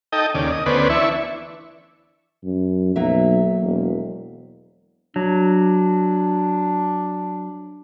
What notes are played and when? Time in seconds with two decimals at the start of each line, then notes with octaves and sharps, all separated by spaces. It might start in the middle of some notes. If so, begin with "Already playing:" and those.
0.12 D#4 A4 D#5 G5
0.34 D#2 C#3 D5
0.52 D#5
0.66 D2 B3 C#4 B4 C5 D5
0.90 E3 D4 E5 C#6
2.44 F#2
2.96 B1 F#3 A#3 E5
3.62 E1
5.16 F#3 D4